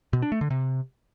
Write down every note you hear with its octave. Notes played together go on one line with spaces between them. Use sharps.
B2
D4
A3
D3
C3